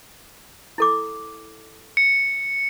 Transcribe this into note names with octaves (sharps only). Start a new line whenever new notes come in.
E4 A4 D6
C#7